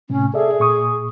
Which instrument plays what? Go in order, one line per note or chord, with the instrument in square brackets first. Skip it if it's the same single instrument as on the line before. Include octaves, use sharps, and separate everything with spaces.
[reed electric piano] A2 C3 [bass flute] C#4
[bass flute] G#4 [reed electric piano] A4 D5 E5
[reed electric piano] A#2 C#6 D#6